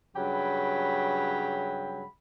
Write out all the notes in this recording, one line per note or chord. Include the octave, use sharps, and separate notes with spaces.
G2 C#3 F#3 G5 B5